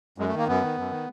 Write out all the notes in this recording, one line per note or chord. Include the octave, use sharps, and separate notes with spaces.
F#2 G#3
A3
D#3 A#3
F#2 B3
D#3
F#2
D#3